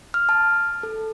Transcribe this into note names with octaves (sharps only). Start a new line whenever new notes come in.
F6
A5
A4